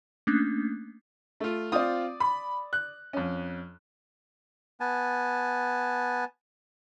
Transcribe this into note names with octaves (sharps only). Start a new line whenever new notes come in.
A3 A#3 C#4 D4
A3 F4
C4 F4 D5 D#6
B5
F#6
F2 C#4
B3 G#5 A5